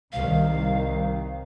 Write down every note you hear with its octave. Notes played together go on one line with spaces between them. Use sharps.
C2 D#3 F5